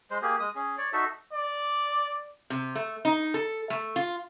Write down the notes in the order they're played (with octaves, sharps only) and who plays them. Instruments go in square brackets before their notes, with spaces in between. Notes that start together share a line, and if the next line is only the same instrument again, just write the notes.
[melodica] G#3 C5
A#3 G4 G#4
G#3 D#6
C#4 G#4
C#5 D5
D#4 F#4 A4 E5
[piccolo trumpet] D5
[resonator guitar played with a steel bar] C3
A3
D#4
A4
A3
F4